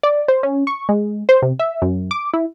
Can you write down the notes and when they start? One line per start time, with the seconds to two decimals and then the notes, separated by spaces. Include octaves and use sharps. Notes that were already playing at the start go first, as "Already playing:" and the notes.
0.03 D5
0.28 C5
0.43 C#4
0.67 C#6
0.89 G#3
1.29 C5
1.42 C3
1.59 E5
1.82 F#2
2.11 D6
2.34 E4